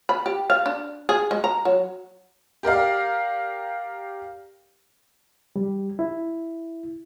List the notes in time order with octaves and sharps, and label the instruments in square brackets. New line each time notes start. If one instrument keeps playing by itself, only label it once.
[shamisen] B5
G4
F5
D4
G#4
G#3
A#5
F#3
[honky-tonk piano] G4 A#4 D5 F5
[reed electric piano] G3
E4